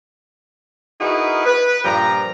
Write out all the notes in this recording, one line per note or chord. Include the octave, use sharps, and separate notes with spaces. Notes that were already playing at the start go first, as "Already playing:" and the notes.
D#4 E4 F#4 G#4 A#4 B4
B4
G2 A#2 F3 G4 A#5